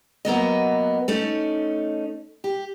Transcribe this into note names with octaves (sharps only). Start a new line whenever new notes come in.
F#3 A#3 B3 D#5
A3 C#4 D#4
G4